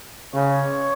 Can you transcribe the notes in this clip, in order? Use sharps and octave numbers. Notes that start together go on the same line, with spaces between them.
C#3 C#5